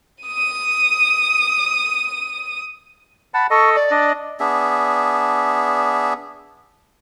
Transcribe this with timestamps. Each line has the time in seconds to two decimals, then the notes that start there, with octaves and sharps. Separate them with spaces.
0.24 D#6 D#7
3.34 F#5 A5 B5
3.50 A4 D#5 C#6
3.76 D5
3.91 D4 D#5
4.40 B3 D4 G#4 E5